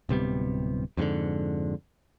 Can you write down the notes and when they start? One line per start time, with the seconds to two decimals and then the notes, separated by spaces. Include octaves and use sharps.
0.09 D1 C3 G3 B3
0.97 F2 G#2 B2 D3